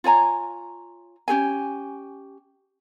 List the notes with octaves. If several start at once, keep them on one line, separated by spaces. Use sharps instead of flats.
F4 C#5 G#5 A#5
C#4 G4 G#4 G#5